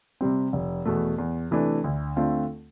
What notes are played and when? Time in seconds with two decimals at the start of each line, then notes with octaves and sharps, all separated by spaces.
0.21 C3 G3 C4
0.53 F1
0.85 E2 B2 A3
1.18 E2
1.51 C3 E3 A3 D4
1.84 D2
2.16 D3 A3 C4 F4